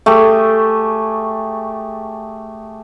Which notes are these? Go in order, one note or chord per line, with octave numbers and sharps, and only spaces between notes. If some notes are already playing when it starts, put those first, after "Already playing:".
A3 G4 G#4